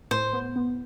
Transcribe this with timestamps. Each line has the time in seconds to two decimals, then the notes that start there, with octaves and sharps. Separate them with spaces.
0.11 A2 C5
0.33 B3
0.56 B3